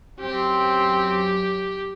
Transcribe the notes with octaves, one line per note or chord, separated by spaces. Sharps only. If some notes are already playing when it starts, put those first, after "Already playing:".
F#2 C4 G4